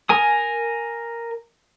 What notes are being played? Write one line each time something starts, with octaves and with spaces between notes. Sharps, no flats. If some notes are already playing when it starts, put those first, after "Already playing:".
A#4 G#5 D#6